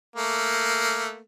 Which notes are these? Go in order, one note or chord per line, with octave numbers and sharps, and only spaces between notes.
A3 A#3